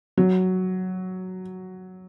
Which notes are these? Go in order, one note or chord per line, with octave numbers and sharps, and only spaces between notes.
F#3